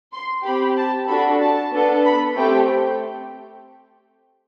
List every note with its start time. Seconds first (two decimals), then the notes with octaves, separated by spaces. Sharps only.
0.13 C6
0.44 C4 G4 B5
0.77 A5
1.07 D4 F#4 A4 B5
1.40 A5
1.72 B3 D4 A4
2.04 B5
2.36 A3 C4 G4 G5